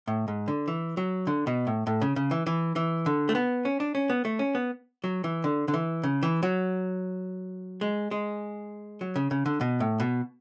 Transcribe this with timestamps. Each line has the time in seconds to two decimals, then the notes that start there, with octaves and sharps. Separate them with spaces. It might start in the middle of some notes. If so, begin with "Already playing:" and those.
0.07 A2
0.28 G#2
0.48 D3
0.68 E3
0.97 F#3
1.27 D3
1.47 B2
1.67 A2
1.87 A2
2.01 C#3
2.16 C#3
2.31 E3
2.46 E3
2.76 E3
3.06 D3
3.29 A3
3.35 B3
3.65 C#4
3.80 D4
3.95 C#4
4.10 B3
4.25 A3
4.39 C#4
4.55 B3
5.04 F#3
5.24 E3
5.44 D3
5.68 D3
5.74 E3
6.03 C#3
6.23 E3
6.43 F#3
7.81 G#3
8.11 G#3
9.01 F#3
9.16 C#3
9.31 C#3
9.46 D3
9.61 B2
9.80 A2
10.00 B2